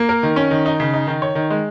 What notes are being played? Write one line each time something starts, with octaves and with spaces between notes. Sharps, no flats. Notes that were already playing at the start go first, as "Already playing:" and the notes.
Already playing: A#3
A#4
D#3
C#4
D#3
D#4
C#3
D#4
D#3
C#5
D#3
G#3